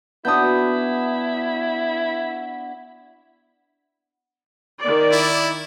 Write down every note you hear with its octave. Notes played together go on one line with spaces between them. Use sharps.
B3 D4 E4 F#4 D#6 G6
D#3 D5
E4